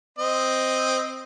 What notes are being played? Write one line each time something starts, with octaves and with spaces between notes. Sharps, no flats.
C4 D#5